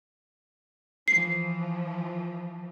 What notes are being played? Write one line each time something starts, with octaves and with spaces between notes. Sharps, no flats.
E3 F3 C7